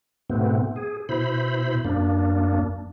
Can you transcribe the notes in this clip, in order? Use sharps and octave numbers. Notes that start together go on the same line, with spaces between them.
G#2 B2 A3 B3 C4
G#4
B2 E4 C5 B5
F#2 A#3 D4